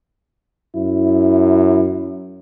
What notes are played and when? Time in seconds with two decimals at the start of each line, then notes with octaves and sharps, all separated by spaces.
0.75 F#2 E4